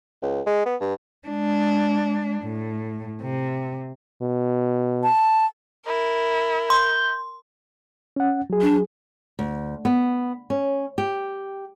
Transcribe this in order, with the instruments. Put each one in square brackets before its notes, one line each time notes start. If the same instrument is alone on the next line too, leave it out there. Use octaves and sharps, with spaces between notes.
[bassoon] C#2
G#3
B3
G2
[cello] G#3 D4
A2
C3
[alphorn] B2
[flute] A5
[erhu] E4 [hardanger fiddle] A#4
[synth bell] C6 [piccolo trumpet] G6
[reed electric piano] C#4 F#5
F#3 G#4
[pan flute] D4
[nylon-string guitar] D2
B3
C#4
G4